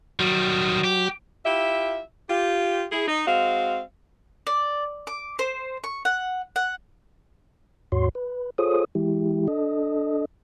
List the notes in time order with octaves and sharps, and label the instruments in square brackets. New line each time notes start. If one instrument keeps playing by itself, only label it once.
[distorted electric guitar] D#3 G3 [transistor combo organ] F#3
[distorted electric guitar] G4
[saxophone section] E4 F4 G4 E5
F4 G4
E4 G#4
D#4
G#3 C4 F#4 F5
[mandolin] D5
D6
C5
C#6
F#5
F#5
[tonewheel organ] D#2 G#2 F#4 C#5 C6
B4
F4 G#4 A4 C5 C#5 D#6
E3 G#3 E4 G4
D4 A4 D#5